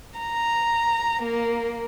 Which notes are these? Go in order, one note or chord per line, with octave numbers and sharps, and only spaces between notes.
A#5
A#3